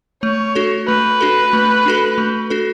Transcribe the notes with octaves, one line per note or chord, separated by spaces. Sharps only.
A3 C#5
D4 F#4 A4
A3 B4
D4 F#4 A4
A3
D4 F#4 A4
A3
D4 F#4 A4